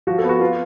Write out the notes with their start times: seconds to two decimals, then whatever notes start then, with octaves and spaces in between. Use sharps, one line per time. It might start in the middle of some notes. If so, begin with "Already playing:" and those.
0.07 F3 F#4
0.18 A4
0.24 B3
0.29 F#4
0.40 B3 F4